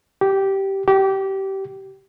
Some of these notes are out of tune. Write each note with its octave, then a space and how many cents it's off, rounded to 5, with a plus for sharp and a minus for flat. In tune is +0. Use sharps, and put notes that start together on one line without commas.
G4 -10
G4 -20